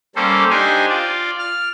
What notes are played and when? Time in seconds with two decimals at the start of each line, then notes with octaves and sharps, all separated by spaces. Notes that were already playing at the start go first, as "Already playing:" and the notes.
0.16 G3 A#3 C#4 A4 C5
0.50 D4 D#4 G4 C5 G#5
0.90 F4 D5
1.39 F6